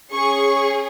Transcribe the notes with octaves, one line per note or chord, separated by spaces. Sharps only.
C#4 G#4 C#6